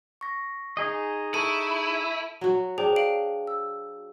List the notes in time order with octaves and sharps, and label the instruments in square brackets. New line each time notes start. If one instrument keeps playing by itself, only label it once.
[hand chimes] C#6 A#6
[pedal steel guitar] D#4 G#4 D#5
[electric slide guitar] E4 [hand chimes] A4 A5 C#6 [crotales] D#7
[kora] F#3 F#4
[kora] D4 [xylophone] G#4 C5 G5
[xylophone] F5 D7 F#7
E6